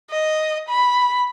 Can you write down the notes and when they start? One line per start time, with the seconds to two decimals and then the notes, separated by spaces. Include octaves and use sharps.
0.11 D#5
0.69 B5